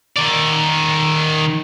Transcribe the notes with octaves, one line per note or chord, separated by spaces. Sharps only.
D#3 D5